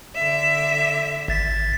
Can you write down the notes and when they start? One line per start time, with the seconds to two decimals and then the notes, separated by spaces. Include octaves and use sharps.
0.16 D3 E5
1.28 G#1 A6 B6